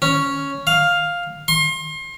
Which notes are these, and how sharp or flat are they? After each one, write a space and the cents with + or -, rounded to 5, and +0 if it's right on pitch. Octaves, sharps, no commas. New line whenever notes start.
C#4 +0
F5 +5
C6 +35